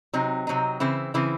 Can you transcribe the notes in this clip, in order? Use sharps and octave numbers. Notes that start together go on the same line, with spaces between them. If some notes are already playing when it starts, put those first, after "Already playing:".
C3 F#3 C4 D#4
C3 F#3 C4 D#4
C#3 E3 C4 E4
C#3 E3 C4 E4